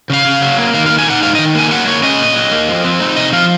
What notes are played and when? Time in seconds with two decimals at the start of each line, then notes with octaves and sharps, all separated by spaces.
0.10 C#3 F5
0.25 C#3
0.42 F#3
0.58 A#3
0.74 D#3 F5
0.86 F5
0.90 A#3
0.98 G#5
1.06 D#4 F#5
1.23 G#2 F5
1.35 D#5
1.39 D#3
1.55 A#3 G#5
1.71 F#3 F#5
1.87 A#3 C#5
2.03 C#4 D#5
2.20 A#2
2.36 F#3
2.51 A#3
2.68 F3
2.85 C4
3.00 D#4
3.16 C3 D#5
3.33 F3 F5